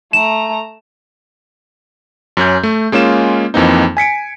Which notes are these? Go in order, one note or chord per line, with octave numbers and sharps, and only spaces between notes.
A3 A#5 E7
F#2 C#4 G6
A3
G#3 A#3 C#4 F4 E7
F2 E3 A#3 C4 D#4
G#5 B6 C#7 D7